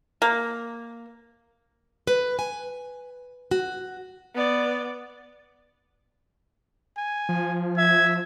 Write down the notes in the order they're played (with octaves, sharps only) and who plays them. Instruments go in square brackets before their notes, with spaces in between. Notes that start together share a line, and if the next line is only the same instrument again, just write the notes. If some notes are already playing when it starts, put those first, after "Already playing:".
[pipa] A#3
[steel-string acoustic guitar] B4
G#5
F#4
[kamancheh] B3 D5
[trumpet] G#5
[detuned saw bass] F3
[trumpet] E5 [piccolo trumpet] G#6